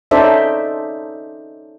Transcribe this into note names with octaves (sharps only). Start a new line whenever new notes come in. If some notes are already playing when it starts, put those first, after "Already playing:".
C#4 D#4 A4 C5 D5 E5